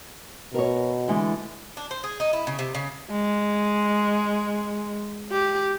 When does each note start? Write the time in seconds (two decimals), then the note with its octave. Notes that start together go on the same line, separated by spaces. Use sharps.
0.54 B2 A#4 C#5
1.08 D3 E3 G#3
1.77 D4
1.91 C5
2.04 G#4
2.20 D#4
2.33 E4
2.47 C#3
2.59 C3
2.75 C#3
3.11 G#3
5.32 G4